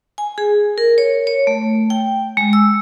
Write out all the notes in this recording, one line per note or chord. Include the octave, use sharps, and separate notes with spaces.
G#5
G#4
A#4
C#5
C#5
A3
G5
G#3
E6